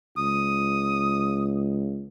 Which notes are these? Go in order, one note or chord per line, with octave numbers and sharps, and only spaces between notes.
C#2 D#6